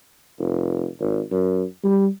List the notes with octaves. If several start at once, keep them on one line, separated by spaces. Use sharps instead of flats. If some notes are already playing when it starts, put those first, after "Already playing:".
F1
G#1
F#2
G3